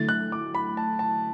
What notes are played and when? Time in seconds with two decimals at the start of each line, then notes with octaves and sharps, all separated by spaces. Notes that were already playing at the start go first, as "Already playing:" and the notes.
Already playing: D3 F#3 A3 E4 A6
0.09 F#6
0.32 D6
0.55 B5
0.77 A5
0.99 A5